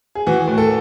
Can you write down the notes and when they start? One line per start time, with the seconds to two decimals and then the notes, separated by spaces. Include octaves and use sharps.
0.15 G#4
0.27 E3 F#4
0.48 A2
0.58 A4